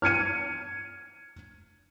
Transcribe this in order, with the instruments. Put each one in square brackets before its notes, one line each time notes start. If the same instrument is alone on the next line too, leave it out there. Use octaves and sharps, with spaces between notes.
[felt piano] F6 G#6 C#7 D#7